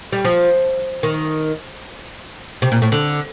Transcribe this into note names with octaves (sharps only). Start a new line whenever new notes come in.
G3
F3
D#3
C3
A#2
A2
D3